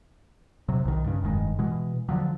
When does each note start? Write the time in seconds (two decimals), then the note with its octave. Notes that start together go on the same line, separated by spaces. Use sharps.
0.69 C3 F#3
0.85 B1 D#3
1.04 G2 C#3
1.22 F1 G2 D#3 G#3
1.59 B2 E3 G#3
2.09 D3 F3 F#3